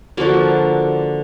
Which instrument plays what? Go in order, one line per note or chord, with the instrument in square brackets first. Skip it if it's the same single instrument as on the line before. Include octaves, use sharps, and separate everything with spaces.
[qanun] D3 F3 A#3 F#4